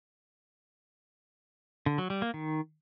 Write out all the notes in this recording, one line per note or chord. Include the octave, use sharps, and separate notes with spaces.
D3
F#3
G3
A#3
D#3